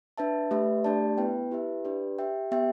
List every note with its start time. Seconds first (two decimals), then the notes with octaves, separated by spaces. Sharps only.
0.18 D4 B4 E5 A5
0.51 A3 G4 B4 E5
0.84 A3 D4 G4 D5 A5
1.18 B3 E4 B4 G5
1.51 E4 G4 B4 E5
1.85 D4 G4 B4 D5
2.18 G4 E5 G5
2.51 B3 G4 E5 G5